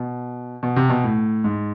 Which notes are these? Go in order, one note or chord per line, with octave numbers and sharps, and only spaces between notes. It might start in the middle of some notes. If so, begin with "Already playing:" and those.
Already playing: B2
B2
C3
B2
A2
G#2